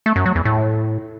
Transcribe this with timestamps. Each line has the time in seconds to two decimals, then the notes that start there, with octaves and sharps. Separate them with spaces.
0.06 A3
0.16 F#2
0.26 F#3
0.35 E2
0.45 A2